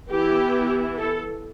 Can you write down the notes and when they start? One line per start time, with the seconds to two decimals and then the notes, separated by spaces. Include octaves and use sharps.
0.11 E3 B3 E4 G4
0.98 A4